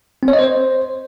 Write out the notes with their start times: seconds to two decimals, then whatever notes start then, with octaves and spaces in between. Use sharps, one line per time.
0.23 C4
0.28 C#5
0.33 D#5
0.39 C5